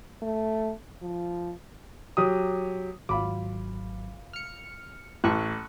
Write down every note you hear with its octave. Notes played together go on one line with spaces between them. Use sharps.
A3
F3
F#3 G4 D#6
G#1 F#3 F4 B5 D6
F6 C#7
A1 C#6 E6 F#6